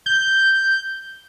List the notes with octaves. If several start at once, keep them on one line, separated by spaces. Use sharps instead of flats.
G6